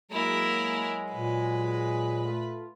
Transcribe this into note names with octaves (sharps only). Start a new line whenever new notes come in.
F#3 G#3 A#3 E4 A#4
A#2 B4
A3 F4